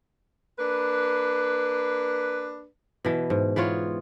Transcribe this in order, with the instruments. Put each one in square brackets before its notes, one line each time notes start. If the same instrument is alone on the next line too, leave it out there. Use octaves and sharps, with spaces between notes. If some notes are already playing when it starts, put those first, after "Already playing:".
[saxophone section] A#3 D4 B4
[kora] B2 E3
G#2
E3 B3 F4 C#5